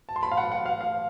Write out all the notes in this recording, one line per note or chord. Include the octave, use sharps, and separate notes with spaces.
A5
C6
B5
F5
F#5
F#5
F5
F5